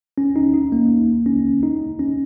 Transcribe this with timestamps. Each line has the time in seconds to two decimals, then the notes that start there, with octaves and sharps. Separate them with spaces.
0.18 C#4
0.36 D#4
0.54 D#4
0.72 A#3
1.26 C#4
1.63 D#4
1.99 C#4